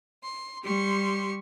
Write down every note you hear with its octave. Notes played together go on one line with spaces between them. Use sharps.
C6
G3 G4 C6 C#6